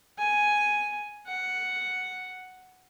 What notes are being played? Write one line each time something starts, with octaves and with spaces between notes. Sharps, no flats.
G#5
F#5